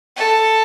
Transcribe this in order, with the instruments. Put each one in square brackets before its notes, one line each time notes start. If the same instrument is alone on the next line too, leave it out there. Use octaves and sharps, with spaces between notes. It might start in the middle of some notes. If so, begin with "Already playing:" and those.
[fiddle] A4